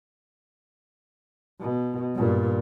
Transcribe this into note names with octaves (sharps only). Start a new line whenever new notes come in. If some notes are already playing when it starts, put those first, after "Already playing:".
B2
G2 A#2